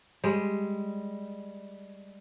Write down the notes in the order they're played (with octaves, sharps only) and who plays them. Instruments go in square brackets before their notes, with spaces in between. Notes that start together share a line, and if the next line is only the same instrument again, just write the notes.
[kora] G3 G#3